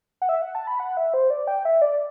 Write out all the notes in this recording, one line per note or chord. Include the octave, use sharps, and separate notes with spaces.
F#5
E5
F#5
A5
B5
F#5
E5
C5
D5
G5
E5
D5